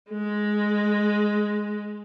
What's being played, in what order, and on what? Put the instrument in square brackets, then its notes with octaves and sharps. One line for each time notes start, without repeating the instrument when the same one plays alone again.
[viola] G#3